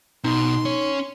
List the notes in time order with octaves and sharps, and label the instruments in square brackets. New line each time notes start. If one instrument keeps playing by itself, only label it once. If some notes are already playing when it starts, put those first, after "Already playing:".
[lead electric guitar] B2 [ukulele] D#4 [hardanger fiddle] C6
[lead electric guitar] C#4 C#5